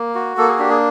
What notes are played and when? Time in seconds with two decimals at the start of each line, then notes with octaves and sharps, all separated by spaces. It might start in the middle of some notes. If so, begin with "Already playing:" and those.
Already playing: A#3
0.15 F#4
0.37 A#3 A4
0.48 G#4
0.59 D4 G4
0.70 G#4